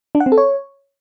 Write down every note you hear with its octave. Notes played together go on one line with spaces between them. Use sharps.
D4
F#5
C4
A4
C#5